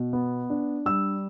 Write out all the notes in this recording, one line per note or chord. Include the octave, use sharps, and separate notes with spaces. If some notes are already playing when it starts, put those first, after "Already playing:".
Already playing: B2
B3
D4
G3 E6